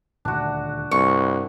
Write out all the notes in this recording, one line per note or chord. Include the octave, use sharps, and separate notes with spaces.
D#1 D2 D4 F#4
C2 G2 C#6